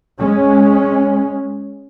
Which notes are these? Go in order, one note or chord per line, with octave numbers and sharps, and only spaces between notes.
G#3 C#4